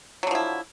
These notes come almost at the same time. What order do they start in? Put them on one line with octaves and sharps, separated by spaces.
F#3 D3 F3 E4